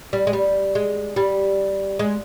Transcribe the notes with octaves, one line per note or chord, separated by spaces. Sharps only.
G3
G#3
G3
G#3
G3
G#3